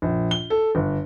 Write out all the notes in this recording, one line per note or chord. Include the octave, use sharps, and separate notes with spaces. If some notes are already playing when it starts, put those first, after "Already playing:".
A#1
G7
A4
G1